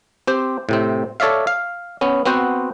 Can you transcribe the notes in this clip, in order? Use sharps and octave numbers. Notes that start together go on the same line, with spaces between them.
C4 G4 C5
A2 C3 C4
A4 C#5 D5 E5 F5
F5
B3 C#4
B3 C4 F#4 C5